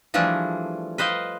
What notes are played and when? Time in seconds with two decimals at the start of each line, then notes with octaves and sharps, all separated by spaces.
0.14 E3 F3 G3 A3 D4 G#4
0.98 B4 C5 D#5 F5 G5